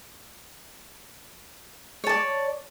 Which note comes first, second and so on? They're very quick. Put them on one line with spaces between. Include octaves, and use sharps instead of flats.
C#5 A5 D5